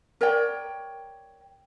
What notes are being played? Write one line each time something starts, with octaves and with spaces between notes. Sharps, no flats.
A#4 C#5 D5 G5